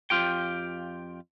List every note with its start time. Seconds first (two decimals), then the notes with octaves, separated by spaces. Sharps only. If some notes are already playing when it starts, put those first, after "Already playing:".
0.10 F2 F4 G4 G5